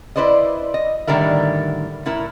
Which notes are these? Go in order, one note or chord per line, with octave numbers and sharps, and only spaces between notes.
E4 B4 C5 D5 D#5
D#5
A2 D3 D#3 G3 A#4 E5
A2 E4 A#4